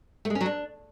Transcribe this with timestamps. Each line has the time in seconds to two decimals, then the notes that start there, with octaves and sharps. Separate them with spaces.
0.25 A3
0.30 G#3
0.35 C#4
0.41 F#3
0.46 D4